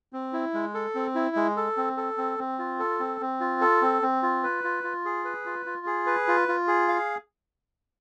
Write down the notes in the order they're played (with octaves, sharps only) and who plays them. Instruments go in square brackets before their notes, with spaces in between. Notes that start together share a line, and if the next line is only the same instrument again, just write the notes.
[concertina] C4
E4
G#3
A4
C4
E4
G#3
A4
C4
A4
C4
C4
F4
A4
C4
C4
F4
A4
C4
C4
F4
B4
F4
F4
G#4
B4
F4
F4
G#4
B4
F4
F4
G#4
F5